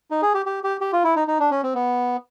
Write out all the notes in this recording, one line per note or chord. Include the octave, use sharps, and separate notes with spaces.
D#4
G#4
G4
G4
G4
G4
F4
E4
D#4
D#4
D4
C#4
C4
B3